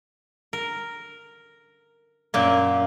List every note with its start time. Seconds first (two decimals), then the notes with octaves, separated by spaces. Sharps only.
0.53 A#4
2.34 F#2 A#2 A#3